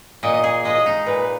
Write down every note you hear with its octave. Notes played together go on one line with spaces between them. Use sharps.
A#2 D#5
G#4
G#3 D#5
D#4
A#2 B4